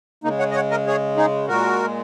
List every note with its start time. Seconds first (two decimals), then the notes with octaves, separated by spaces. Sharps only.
0.24 C#3 G#3 A#3 D#4
0.39 C#5 F#5
0.51 D#5
0.55 C#5 F#5
0.71 A#4 D#5
0.87 G#4 C#5
1.17 D#4 G#4
1.48 A#2 G#3 F#4 A#4